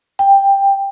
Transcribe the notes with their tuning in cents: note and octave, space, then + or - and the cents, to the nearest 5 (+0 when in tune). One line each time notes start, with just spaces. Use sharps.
G5 +10